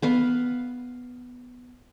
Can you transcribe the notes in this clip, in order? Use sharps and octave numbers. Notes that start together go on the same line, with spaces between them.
B3 B4 F5